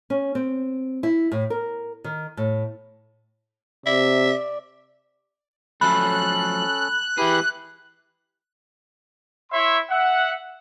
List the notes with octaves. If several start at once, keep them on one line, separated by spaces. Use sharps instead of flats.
C#4
C4
E4
A2
A#4
D#3
A2
C3 D5 E5
F3 F#3 A3 C#4 A4 B5 F#6
E3 E4 G4 G#4 B4
E4 C#5 E5 B5 C6
E5 F#5